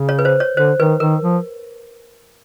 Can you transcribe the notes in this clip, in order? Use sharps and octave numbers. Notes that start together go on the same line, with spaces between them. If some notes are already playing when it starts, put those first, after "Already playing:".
Already playing: C#3
C#5
B4
C5
C#5
D3 C5
D#3 B4
D#3 A#4
F3